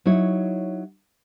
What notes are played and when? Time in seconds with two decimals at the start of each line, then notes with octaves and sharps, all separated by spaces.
0.05 F#3 D#4 E4 C#5